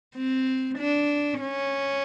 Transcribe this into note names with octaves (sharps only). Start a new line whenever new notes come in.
C4
D4
C#4